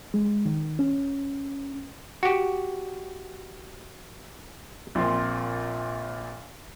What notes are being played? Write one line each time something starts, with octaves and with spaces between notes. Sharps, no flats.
G#3
D#3
C#4
F#4 G4
A#1 A#2 C4 C6